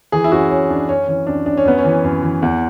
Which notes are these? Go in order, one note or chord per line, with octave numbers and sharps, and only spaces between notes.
E3 G#4
E4
F#2 F#4
F#2 C#4
F#2 D4
F#2 C#4
E3 C#4
F#2 D4
F#2 D4
C#4
F#2 B3
C#4
E3
F#2
E3
E2